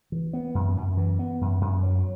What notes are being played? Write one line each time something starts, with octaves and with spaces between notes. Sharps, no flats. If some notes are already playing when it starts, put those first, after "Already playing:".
E3
B3
F#2
F#2
E3
B3
F#2
F#2
F#3